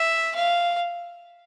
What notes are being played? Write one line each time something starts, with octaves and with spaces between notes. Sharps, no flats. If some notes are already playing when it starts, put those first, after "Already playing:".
Already playing: E5
F5